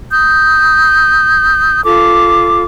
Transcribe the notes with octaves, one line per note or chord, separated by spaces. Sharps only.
D#6 G6
F4 A4 D6